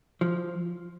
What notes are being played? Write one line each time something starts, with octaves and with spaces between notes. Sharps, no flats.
F3